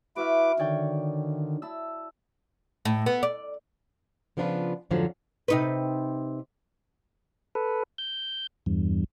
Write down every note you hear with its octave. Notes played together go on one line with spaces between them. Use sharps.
E4 F#4 B4 E5 D6 F6
D3 D#3 C#5 D5 G5
E4 A5 E6
A2
B3
D5
C#3 F3 B3 D4 F4 B4
F2 G#2 D3 F3 F#3
C3 D#4 B4
A4 B4
G6
E2 G2